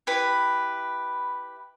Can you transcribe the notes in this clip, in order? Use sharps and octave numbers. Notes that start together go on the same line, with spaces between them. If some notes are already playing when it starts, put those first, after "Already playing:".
E4 G4 B4 B5